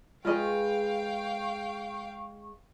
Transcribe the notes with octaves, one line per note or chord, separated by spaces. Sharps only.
G#3 F4 G#4 B4 D#5 F5 G5 C#6